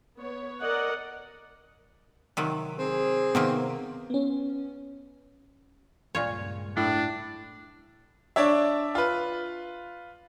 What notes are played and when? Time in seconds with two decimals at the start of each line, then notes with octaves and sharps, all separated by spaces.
0.18 B3 C#5
0.61 A#4 D5 D#5 F#5
2.37 C3 D#3 F#3
2.78 C4 G#4
3.35 C3 D#3 A#3 B3
4.10 B3 C#4
6.15 C#2 G2 A#2 F4 C#5
6.77 A2 D4
8.36 D4 C#5 D5 E5
8.95 F4 B4